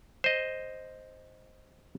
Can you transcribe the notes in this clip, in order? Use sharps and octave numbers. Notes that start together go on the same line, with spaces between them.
C5 D#5